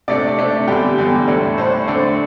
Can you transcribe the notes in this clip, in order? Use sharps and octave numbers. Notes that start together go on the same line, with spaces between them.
C3 A3 D4 D5 D6
C3 A3 D4
E2 D3 G3 G4 G5
E2 D3 G3
A2 A3 D4
A2 A3 D4 C5
D3 A3 C4 D4 D5